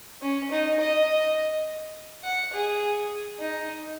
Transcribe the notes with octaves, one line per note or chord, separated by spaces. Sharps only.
C#4
D#4
D#5
F#5
G#4
D#4